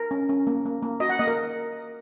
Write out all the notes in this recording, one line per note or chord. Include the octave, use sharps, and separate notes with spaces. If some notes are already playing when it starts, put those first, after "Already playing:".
Already playing: A#4
C#4
C#4
A#3
A#3
A#3
F#4 D#5
F#5
A#3 D#5
A#4